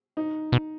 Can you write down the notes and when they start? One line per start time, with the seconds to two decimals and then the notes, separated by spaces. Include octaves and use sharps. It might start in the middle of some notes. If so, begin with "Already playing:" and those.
0.17 D#4
0.52 B2